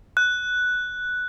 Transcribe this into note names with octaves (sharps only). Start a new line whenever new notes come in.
F#6